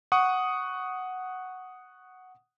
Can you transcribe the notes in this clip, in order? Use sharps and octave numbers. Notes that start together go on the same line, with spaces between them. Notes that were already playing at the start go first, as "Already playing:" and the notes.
F#5 C#6 D#6